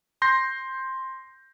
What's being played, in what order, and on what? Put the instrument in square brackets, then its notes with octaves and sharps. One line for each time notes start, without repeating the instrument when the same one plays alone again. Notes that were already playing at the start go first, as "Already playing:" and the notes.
[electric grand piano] C6 G6 A#6 C7